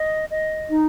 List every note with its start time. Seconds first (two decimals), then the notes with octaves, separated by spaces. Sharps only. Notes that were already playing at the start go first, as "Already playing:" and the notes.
Already playing: D#5
0.30 D#5
0.68 D#4